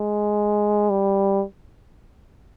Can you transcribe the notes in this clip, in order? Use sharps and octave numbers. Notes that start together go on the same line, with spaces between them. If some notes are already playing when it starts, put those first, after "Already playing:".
Already playing: G#3
G3